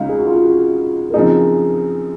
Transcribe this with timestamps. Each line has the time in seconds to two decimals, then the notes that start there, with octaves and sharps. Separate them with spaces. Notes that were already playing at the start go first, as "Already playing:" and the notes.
Already playing: C#2 C#3 G#3 D#4 F5
0.09 G#4
0.19 F#4
0.26 F4
0.36 G#4
0.44 F#4
1.10 A#4
1.14 F#2 C#3 F3 C4 D#4 G#4